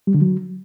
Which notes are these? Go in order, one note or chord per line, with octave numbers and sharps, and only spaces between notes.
G3
D3
F#3